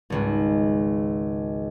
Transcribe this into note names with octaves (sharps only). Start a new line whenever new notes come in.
G#1 C#2 G#2